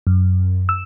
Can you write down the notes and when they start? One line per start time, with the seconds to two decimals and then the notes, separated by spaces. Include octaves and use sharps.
0.07 F#2
0.69 E6